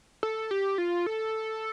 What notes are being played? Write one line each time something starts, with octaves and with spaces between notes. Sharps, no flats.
A4
G4
F4
A4